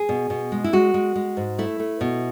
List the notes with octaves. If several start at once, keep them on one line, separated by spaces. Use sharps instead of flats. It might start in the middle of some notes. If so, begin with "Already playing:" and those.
Already playing: G#4
B2
B2
G#3
E4
G#3 F#4
G#3
G#3
G#2
A3 E4
A3
B2